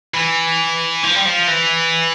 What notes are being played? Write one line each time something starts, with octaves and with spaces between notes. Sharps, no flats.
E3
F3
G3
F3
E3